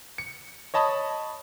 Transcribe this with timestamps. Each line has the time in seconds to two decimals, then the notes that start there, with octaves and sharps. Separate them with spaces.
0.18 C#7
0.74 C#5 D#5 A5 B5 D#6